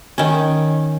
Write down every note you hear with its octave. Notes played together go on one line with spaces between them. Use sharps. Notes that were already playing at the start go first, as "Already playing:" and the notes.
D#3 C#4